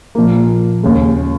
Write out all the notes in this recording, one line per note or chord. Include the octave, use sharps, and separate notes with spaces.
A#2 F3 A#3
D#2 C#3 G#3